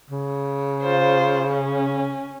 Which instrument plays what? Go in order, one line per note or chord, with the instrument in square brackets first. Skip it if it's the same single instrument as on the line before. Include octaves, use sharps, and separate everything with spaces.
[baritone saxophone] C#3
[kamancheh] F4 C5
C#4